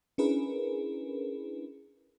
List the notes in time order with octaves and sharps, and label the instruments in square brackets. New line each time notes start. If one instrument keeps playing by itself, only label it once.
[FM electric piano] C#4 D4 E4 G#4 A#4 B4